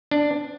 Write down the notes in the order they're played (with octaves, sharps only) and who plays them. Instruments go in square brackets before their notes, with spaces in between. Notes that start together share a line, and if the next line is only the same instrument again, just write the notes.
[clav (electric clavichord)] D4